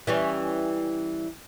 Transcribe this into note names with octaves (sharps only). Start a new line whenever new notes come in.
E3 G3 C#4